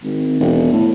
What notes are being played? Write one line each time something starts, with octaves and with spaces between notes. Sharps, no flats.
G#1
E1
A2